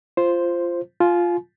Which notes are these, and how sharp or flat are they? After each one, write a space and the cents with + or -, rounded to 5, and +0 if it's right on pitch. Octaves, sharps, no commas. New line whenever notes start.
F4 -15 C5 +0
F4 +0 G#5 +35